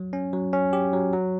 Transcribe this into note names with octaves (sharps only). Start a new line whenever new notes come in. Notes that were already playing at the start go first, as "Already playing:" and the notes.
Already playing: F#3
C#4
F#3
C#4
G4
F#3
F#3